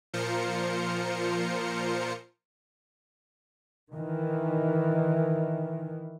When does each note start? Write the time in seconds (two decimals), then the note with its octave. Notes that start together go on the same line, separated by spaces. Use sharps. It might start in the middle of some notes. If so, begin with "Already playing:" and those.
0.13 A#2 F3 F4 A#4 C5 C#7
3.92 D#3 E3